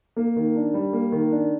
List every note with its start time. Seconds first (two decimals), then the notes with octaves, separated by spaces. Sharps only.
0.16 A#3
0.36 D#3
0.56 D4
0.74 G3
0.93 A#3
1.12 D#3
1.31 D4